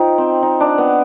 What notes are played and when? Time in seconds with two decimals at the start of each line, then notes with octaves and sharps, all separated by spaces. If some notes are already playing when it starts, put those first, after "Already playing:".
Already playing: D#4 F4 C5 G5
0.18 C4
0.43 D#4
0.60 D4
0.78 B3